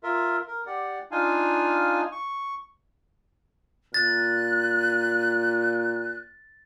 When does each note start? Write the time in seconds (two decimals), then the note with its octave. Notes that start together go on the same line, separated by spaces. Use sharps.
0.03 F4 A#4 E5
0.47 A#4
0.66 G4 D5 F#5
1.11 D4 D#4 F4 F5 G#5
2.12 C#6
3.94 A#2 F#6 A6